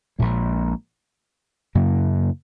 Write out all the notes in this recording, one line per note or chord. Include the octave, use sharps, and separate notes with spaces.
A#1 A#2 G#3
F#2 C#3 F#3 A#3